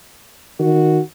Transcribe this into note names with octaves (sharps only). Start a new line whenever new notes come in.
D#3 F#4